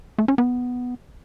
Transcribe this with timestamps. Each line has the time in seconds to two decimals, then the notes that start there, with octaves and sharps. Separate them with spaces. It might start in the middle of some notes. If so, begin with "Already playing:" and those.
0.18 A3
0.28 C#4
0.38 B3